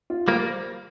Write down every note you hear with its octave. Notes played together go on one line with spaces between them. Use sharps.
F4
G3 A#3 C5